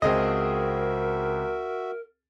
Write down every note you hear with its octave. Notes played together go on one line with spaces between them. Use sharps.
C#2 C4 F#4 G#4 A#4 D#5 E5